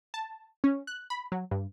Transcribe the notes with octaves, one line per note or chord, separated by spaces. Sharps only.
A5
C#4
F#6
B5
F#3
G2